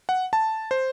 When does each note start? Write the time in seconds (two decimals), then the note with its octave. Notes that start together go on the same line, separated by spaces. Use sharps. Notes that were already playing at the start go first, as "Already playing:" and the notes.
0.09 F#5
0.33 A5
0.71 C5